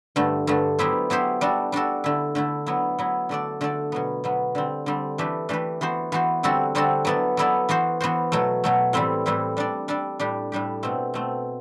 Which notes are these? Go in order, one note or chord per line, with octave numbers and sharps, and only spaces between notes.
G2 D3 A3
G2 D3 A3
F#3 B3 E4 G4 C5
F#3 B3 E4 G4 C5
G3 D4 F#4 A4
G3 D4 F#4 A4
D3 A3 E4
D3 A3 E4
F#3 B3 E4
F#3 B3 E4
D3 A3 D4 A4 D5
D3 A3 D4 A4 D5
B2 F#3 B3
B2 F#3 B3
D3 G3 C4
D3 G3 C4
E3 A3 D4 G4 B4
E3 A3 D4 G4 B4
E3 B3 F#4 C5
E3 B3 F#4 C5
D3 G3 C4 F#4 A4
D3 G3 C4 F#4 A4
F#3 B3 E4 A4 D5
F#3 B3 E4 A4 D5
E3 B3 F#4 C5
E3 B3 F#4 C5
B2 F#3 A3
B2 F#3 A3
A2 E3 G3 C4 E4
A2 E3 G3 C4 E4
G3 D4 A4 D5
G3 D4 A4 D5
A2 G3 D4 G4
A2 G3 D4 G4
B2 A3 C4
B2 A3 C4